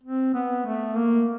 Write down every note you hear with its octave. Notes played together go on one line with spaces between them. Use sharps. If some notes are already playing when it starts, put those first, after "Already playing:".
C4
B3
A3
A#3